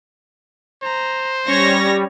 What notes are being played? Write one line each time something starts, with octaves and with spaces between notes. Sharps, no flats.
C5 A#5
G3 C#4 C#5 A#6